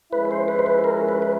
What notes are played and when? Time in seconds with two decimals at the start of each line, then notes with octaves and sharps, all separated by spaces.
0.12 F3 G#3 C#4 E4 B4
0.31 C5
0.48 B4
0.59 C5
0.66 B4
0.84 A#4
1.09 B4
1.22 B4